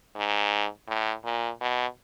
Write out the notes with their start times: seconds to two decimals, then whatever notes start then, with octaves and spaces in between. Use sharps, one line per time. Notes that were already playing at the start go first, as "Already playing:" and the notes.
0.16 G#2
0.88 A2
1.25 A#2
1.61 B2